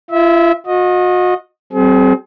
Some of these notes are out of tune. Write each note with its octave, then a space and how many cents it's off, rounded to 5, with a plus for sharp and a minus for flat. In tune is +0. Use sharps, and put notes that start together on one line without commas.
F4 -45 E5 -20
F#4 -40 D#5 +0
G3 -45 C4 +0 G#4 +40